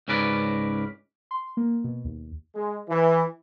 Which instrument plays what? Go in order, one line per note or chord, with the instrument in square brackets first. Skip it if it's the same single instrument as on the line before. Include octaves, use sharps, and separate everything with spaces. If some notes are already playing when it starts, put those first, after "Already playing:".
[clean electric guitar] C#2 G#2 C#4 A#4 B4 D5
[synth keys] C6
A#3
B2
D#2
[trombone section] G#3
E3